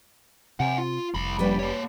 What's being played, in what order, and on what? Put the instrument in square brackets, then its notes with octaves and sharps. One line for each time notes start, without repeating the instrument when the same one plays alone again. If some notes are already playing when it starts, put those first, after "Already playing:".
[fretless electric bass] C3 [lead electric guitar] F#5 G#5
[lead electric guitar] F4
[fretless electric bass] F1 [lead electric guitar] C2 B5
[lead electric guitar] F3 A#3 [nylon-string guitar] G3 C#4 B4
[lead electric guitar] A#3 C#5